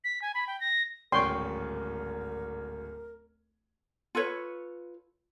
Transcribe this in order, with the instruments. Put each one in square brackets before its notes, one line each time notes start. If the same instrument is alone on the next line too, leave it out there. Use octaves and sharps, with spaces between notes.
[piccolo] B6
G#5
B5
G5
A#6
[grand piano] D1 G#1 C#4 [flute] A#4 [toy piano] D5 C#6 [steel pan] G5 C6
[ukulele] F4 A4 B4 C#5